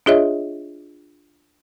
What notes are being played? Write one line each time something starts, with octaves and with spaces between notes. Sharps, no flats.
D4 F4 G#4 C#5 D#5 E5